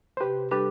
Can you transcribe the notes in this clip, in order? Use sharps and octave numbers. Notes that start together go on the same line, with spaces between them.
C5
C3 G4 B4
G3 D4 G4 A4 B4